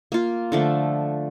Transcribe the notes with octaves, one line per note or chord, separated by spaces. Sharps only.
A#3 F4
D3 F3 A3